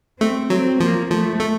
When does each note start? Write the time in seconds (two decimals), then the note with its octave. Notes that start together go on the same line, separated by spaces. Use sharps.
0.20 A3 C4
0.50 F#3 C4
0.80 F3 A#3
1.10 F3 A3
1.40 A3